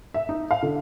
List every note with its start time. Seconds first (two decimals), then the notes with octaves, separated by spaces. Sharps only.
0.14 E5
0.29 D#4
0.51 F5
0.63 D3